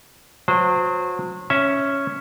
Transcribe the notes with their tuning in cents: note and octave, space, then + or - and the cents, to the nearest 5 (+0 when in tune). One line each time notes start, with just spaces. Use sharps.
F#3 -35 C5 -20
C#4 +0 E5 +0